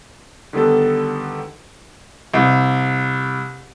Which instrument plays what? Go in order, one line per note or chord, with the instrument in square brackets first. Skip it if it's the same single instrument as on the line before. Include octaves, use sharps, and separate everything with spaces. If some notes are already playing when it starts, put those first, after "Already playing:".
[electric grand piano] D3 D#3 G3 B3 A4
[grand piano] C2